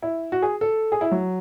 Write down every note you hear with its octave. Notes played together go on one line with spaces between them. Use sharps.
E4
F#4
G#4
A4
G#4
E4
F#3